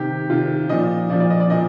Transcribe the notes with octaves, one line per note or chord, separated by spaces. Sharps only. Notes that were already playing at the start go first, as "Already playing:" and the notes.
Already playing: C3 D#3 G4
C3 D#3 F4
A#2 F3 D#5
A#2 F3 D5
D5
D#5
D5
A#2 F3 D#5